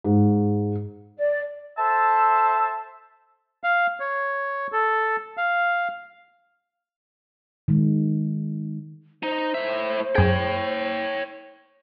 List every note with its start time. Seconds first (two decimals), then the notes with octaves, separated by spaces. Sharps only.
0.04 G#2
1.18 D5
1.78 A4 C5 E5 A5
3.64 F5
4.00 C#5
4.72 A4
5.37 F5
7.68 D#3 G#3
9.23 D#4 C5
9.54 A2 E5
10.15 F#2 G#4 C#5 G5